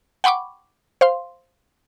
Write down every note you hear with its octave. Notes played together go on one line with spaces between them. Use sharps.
F#5 G5 B5 C#6 D6
C5 F5 C6